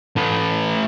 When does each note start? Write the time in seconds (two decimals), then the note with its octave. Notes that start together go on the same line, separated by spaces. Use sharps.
0.17 A3 B4